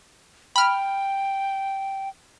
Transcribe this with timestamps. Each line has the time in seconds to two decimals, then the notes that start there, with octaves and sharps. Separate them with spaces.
0.56 G5 B5 F6